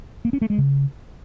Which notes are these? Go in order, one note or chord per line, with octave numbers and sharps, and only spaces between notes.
A#3
C#4
A3
G#3
C#3